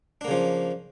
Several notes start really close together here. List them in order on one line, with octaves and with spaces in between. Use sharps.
D4 A#3 C#3 F3